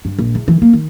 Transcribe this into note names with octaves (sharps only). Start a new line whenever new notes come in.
G2
A#1
E2
E3
A#3
D#3